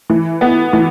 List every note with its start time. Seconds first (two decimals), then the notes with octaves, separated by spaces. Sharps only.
0.10 E3
0.41 B3
0.73 E3